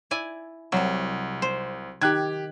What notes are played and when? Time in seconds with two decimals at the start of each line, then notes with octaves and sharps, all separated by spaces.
0.11 E4 D5 G#5
0.72 C2 C3 F#3
1.42 C5
2.01 D#3 G4 F#6 G#6